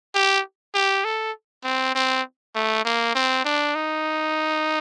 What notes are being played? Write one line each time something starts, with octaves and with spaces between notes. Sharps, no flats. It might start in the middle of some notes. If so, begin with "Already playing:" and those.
G4
G4
A4
C4
C4
A3
A#3
C4
D4
D#4